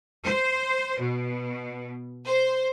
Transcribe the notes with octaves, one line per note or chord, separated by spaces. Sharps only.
C5
B2
C5